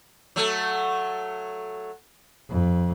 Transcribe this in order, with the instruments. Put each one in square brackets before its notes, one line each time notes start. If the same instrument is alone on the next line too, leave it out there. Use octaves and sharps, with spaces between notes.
[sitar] F#3 A3
[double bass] F2